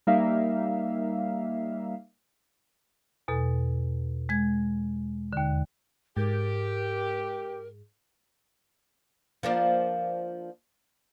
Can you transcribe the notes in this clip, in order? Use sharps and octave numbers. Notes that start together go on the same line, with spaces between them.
G3 A#3 D#4 E5 F5
E2 B2 A4
G#3 G#6
D#2 D3
G#2 G4 A#4
F3 A#3 D4